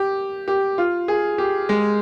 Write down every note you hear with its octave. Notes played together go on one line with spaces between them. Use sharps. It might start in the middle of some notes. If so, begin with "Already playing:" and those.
Already playing: G4
G4
F4
G#4
G4
G#3